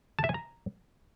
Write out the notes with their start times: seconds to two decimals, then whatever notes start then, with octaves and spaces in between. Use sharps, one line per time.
0.19 A5
0.24 E5
0.29 G#5
0.34 A#5